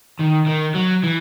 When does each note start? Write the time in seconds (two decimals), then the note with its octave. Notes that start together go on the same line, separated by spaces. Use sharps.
0.21 D#3
0.48 D#3
0.76 F#3
1.04 E3